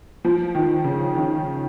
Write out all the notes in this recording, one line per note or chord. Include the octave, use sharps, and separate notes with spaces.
F3
D#3
C#3
D#3